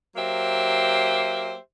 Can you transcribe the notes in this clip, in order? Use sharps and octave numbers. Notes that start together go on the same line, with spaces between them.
F#3 A#3 G4 C5 E5